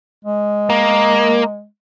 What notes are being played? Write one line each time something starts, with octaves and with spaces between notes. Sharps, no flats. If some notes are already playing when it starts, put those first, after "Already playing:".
G#3
A#3